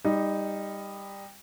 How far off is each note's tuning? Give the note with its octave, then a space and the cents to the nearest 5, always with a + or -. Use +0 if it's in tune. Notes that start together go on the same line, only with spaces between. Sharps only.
G3 +20 D#4 +0